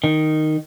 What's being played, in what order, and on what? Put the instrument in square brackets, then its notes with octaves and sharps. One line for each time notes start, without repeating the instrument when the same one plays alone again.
[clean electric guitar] D#3